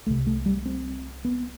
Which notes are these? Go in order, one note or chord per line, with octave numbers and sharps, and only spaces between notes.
C2 C3 A3
A3
G3
C4
B3